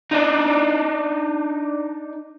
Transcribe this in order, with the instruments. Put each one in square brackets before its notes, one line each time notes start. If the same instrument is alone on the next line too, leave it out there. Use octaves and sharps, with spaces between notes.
[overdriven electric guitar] D4 D#4